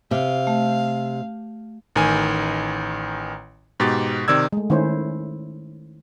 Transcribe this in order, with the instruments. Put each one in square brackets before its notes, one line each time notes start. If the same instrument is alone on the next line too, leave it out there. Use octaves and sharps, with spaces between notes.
[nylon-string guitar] C3 [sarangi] F5
[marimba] A3
[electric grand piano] A1 D#3 G#5
G#2 B2 G4 A6
C3 D#3 D5 E6 G#6
[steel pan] G#3 A3
D#3 A3 C#4 E4 C5 C#5